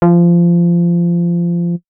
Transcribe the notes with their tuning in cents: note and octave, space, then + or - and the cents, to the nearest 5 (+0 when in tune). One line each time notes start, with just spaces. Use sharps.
F3 -20